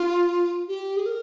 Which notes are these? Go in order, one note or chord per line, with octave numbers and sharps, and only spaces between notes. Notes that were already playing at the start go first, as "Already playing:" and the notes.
Already playing: F4
G4
G#4
A#4